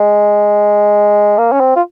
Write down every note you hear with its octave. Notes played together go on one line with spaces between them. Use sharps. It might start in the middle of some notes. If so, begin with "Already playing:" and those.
Already playing: G#3
A#3
C#4
C4
F4